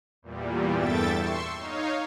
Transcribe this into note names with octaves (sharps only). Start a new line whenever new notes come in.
E2 A#2 G3
E2 G2 A4 E5 G5 A6
C6 C#6 E6
D#4 C#5 F5